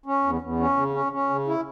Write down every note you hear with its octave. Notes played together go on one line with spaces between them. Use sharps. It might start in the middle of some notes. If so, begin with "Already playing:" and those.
C#4
E2
E2
C#4
C#3
C#4
C#4
C#3
E4